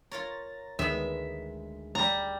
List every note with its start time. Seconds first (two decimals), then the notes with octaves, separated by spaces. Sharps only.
0.11 F4 A#4 C#5 A#5 A6 A#6
0.79 D2 D#3 G#3 B3 E5
1.95 G3 A#5